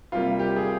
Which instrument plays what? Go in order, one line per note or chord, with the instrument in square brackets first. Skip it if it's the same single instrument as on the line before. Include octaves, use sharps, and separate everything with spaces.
[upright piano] C3 G3 A#3 F4
G4
G#4